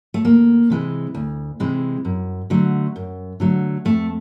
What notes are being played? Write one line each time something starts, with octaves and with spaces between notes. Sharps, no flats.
A3
D2 A#3
C3 E3 G#3
D2
C3 E3 G#3
F#2
D3 F#3 A3
F#2
D3 F#3 A3
F2 A3